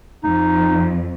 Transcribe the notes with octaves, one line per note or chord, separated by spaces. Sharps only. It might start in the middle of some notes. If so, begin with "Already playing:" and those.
F2 D#4